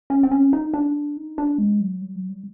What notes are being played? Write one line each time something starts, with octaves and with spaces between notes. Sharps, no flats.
C#4
C4
C#4
D#4
D4
D#4
D4
G#3
F#3
G3
F#3
G3